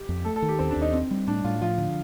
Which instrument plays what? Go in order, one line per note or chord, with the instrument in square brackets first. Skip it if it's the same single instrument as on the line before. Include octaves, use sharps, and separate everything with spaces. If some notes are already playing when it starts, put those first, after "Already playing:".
Already playing: [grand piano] G4
[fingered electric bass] F2
[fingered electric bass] A3 [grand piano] A4
[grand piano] A4
[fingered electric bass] D#3
[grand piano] G4
[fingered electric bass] D#2 [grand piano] C4
[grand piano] D4
[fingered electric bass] D#2
[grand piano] D#4
[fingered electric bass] C4
G3
[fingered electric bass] A2 [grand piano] D4
[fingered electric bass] A2 [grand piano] F4
[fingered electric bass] F3 [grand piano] F4
[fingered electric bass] D3